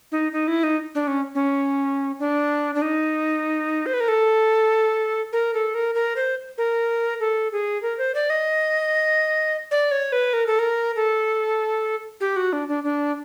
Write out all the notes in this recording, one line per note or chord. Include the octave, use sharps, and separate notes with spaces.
D#4
D#4
E4
D#4
D4
C#4
C#4
D4
D4
D#4
C5
B4
A#4
A4
A#4
A4
A#4
A#4
C5
A#4
A4
G#4
A#4
C5
D5
D#5
D5
C#5
B4
A#4
A4
A#4
A4
G4
F#4
D4
D4
D4